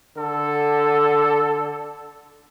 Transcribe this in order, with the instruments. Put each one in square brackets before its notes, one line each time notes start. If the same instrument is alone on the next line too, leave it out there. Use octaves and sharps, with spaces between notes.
[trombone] D3 [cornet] A4